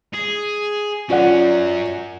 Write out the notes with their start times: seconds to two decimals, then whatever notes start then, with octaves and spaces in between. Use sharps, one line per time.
0.14 G#4
1.10 F#2 C#4 F4 D5 F#5